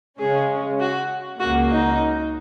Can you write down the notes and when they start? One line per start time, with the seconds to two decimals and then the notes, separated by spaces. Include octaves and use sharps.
0.19 C#3 G#3 C#4 G#4
0.80 F#4
1.40 C#2 C#3 A#3 F#4
1.71 D#4